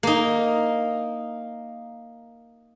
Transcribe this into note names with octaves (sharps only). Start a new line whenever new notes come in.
A#3 D#4